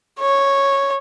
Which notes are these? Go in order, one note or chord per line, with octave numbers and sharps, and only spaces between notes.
C#5